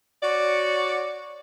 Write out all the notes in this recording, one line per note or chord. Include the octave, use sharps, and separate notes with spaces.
F#4 C#5 D5